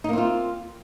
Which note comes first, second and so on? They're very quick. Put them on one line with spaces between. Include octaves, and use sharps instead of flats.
D#4 A#3 C4 F4